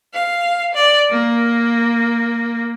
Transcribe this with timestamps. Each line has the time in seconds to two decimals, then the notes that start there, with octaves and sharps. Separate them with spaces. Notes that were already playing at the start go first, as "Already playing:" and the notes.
0.13 F5
0.73 D5
1.10 A#3